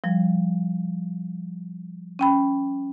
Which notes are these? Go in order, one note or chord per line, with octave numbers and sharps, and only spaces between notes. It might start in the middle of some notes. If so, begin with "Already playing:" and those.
F3 G3
C#4 G5 B5